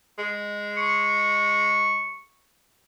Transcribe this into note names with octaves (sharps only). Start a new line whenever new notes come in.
G#3
C#6